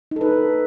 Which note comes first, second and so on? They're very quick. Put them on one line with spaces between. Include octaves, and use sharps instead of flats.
D#4 A4 B4